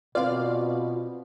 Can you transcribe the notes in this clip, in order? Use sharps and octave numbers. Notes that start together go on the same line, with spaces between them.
B2 C4 F4 B4 D5 F5